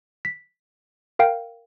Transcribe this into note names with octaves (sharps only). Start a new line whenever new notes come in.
B6
A#4 F5 G5